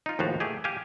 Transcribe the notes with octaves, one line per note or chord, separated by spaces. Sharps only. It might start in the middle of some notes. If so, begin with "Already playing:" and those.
D#4 F4
D#2 A2 F3 F#4 F5
A3 G4 G#4
G4 F5 G#5